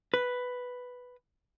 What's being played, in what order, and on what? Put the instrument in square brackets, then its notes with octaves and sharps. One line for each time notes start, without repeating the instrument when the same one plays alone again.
[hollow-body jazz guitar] B4